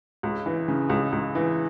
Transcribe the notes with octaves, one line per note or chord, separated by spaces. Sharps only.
C#2
E3
C#3
C#2
C#2
E3